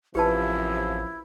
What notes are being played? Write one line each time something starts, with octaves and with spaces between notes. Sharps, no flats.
A1 F#2 C3 F3 E4 G4 B4 A5